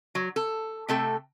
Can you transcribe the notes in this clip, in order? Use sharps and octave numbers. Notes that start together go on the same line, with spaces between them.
F#3
A4
C3 A3 A4 G5